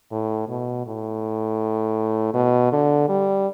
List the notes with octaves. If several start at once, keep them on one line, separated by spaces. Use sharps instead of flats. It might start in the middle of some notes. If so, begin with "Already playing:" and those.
A2
B2
A2
B2
D3
G3